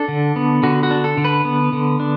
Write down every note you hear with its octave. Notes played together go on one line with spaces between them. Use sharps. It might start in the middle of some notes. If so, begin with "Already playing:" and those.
Already playing: D4 A4
D3
B3
D3 F#4
F#4
D4
A4
D3
B4
B3
D3
D4